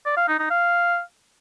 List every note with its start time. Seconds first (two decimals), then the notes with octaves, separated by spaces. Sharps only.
0.06 D5
0.17 F5
0.28 D#4
0.39 D#4
0.50 F5